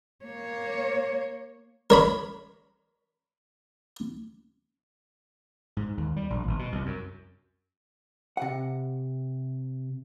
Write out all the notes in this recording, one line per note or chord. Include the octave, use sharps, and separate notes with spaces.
A#3 C#5
A#4 C#5 B5
G#2
D#2
G3
A#1
G1
B2
C2
F#2
C3 F#5